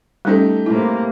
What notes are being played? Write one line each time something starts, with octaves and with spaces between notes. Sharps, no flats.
G3 A3 C#4 D#4 G4
A2 C3 A#3 E4